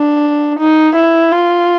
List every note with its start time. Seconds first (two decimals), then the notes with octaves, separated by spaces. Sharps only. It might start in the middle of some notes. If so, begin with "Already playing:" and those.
Already playing: D4
0.59 D#4
0.96 E4
1.32 F4